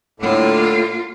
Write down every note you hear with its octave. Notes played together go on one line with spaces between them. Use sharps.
A2 D3 A#3 F4